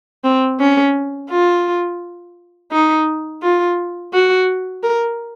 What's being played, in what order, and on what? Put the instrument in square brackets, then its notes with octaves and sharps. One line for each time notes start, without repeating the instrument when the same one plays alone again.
[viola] C4
C#4
F4
D#4
F4
F#4
A#4